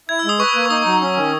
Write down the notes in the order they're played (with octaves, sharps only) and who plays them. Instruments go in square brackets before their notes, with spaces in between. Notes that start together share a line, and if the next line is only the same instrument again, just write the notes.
[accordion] E4 [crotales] G#6
[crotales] E6
[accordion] G#3 [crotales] D#6
[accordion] B4 [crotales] C#6
[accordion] A#3
[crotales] C#6
[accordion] D#4 [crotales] D#6
[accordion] F#3
C#4
D#3